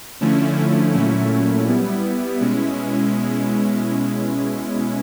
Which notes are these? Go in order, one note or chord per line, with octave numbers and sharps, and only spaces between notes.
D3 F3 A3 C#4 E4
A#2 F#3 A3 C#4 E4
G3 B3 E4
B2 G#3 C#4 E4